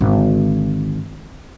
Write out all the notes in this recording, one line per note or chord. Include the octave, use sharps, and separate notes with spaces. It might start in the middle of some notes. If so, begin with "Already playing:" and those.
G#1 D3